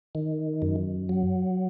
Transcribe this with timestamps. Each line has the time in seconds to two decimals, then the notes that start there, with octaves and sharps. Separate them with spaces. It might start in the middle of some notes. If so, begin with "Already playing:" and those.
0.15 D#3
0.62 F#2
1.09 F#3